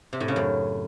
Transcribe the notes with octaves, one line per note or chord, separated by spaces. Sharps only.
C3
A2
C#3
F#2